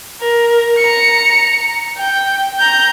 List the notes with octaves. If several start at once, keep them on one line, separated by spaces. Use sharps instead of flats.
A#4
A#5 C#7
G5
A#5 G6